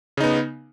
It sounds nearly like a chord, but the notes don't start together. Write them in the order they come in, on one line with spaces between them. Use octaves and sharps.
C#3 D#4 B3